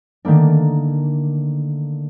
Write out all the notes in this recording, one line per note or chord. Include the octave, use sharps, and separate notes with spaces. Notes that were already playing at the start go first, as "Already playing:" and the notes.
D3 D#3 A3 A#3 D4